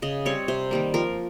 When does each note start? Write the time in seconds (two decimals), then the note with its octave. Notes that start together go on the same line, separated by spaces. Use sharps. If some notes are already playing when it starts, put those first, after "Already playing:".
0.02 C#3 D#5
0.25 G3 C4 C#5
0.48 C3 C5
0.71 D#3 G3 A#3
0.94 F3 A#4